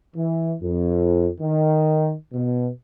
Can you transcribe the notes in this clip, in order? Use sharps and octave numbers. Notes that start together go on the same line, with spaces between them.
E3
F2
D#3
B2